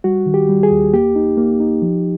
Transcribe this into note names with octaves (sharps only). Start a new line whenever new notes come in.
G3 F#4
D#3
G4
G3
G#4
D#2
A#3 G4
D#4
A#3
D#4
F3